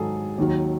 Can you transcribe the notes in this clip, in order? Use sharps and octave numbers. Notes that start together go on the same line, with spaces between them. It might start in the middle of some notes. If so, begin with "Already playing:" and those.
Already playing: G#2 D#3 F#3 G#4 A4
D#2 D#3 F#3